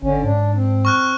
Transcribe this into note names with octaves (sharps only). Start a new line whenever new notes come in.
G#1 D3 C#4
G#2 D4
C4
C#6 F6 F#6